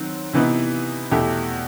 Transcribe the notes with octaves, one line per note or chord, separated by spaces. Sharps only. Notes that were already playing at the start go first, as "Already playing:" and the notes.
Already playing: D#3 F#3 C4
C3 E3 B3 D#4
E2 B2 A3 E4 G4